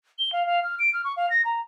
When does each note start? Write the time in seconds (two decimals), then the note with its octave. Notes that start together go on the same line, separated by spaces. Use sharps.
0.19 G7
0.33 F5
0.46 F5
0.63 F6
0.79 D7
0.93 F6
1.04 C#6
1.17 F5
1.30 A#6
1.45 A#5